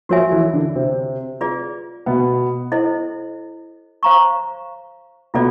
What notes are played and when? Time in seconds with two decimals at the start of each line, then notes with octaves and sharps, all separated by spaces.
0.09 F3 F4 F#4 A#4 C#5 E5 G#5
0.31 E3 E4
0.53 D3 D4
0.75 C3 C4
1.41 F4 G#4 B4 D5
2.06 B2 B3
2.72 E4 A4 C5 D#5
4.03 C5 F5 A#5 C#6
5.34 B2 B3 F4 A4 D5